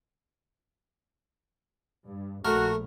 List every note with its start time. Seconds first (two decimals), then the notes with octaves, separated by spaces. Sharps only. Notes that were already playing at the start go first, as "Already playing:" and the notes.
2.07 G2
2.45 A#1 A3 F#4 A#4